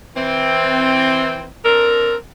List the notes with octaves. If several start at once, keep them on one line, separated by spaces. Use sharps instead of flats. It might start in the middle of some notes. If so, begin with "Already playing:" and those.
E3 C4
C4 D4 A4 A#4